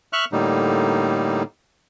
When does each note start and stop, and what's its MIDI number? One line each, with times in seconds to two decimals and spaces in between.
0.13 0.25 76
0.13 0.25 85
0.13 0.25 89
0.13 0.25 90
0.32 1.43 45
0.32 1.43 50
0.32 1.43 55
0.32 1.43 58
0.32 1.43 63